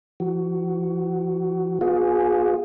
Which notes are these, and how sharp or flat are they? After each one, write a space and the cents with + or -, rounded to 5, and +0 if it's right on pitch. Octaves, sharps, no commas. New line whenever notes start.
F3 -35 F#4 +20
B3 +0 F4 +40 G#4 +0